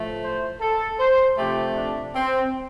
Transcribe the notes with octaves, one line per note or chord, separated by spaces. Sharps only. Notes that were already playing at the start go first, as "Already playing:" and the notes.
Already playing: A2 F3 A3
C5
A4
C5
C3 F3 A3 G4
D4
C4